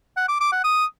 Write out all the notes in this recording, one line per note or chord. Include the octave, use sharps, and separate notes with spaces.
F#5
D6
D6
F#5
D#6